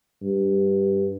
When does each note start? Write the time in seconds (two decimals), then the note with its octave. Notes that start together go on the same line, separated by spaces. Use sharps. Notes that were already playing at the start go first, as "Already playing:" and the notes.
0.22 G2